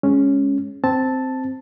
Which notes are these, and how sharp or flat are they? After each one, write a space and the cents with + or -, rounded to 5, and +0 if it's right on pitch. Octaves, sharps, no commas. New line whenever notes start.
G#3 +0 C#4 +0
C4 -5 A5 +0